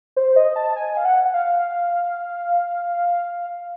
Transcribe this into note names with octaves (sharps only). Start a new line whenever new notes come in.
C5
D#5
A5
G#5
F5
F#5
F#5
F5